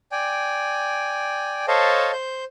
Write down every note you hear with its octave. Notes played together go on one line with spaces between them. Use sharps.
D5 G5 G#5
A4 C5 C#5 D#5 F5 A5
C5 G6